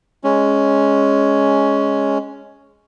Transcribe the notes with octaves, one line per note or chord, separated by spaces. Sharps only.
G#3 C#4